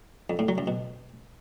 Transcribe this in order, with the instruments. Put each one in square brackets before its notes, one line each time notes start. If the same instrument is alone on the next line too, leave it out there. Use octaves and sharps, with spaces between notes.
[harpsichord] F2
A2
F#3
F#2
B2